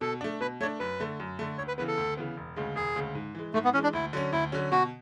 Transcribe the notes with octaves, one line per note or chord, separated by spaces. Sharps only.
B2 A4
A3 D4
B2 B4
A3 D4 C#5
F#2 B4
D3 A3
F#2
D3 A3
D2 C#5
B4
C#3 E3 B3 B4
A4
D2
C#3 E3 B3
E1
D2 C#3 G#3
E1 G#4
D2 C#3 G#3
G#2
E3 G#3
G#2 A3
B3
E3 G#3 C#4
D4
D2 E4
D3 F#3 C#4
D2 E4
D3 F#3 C#4
B2 F#4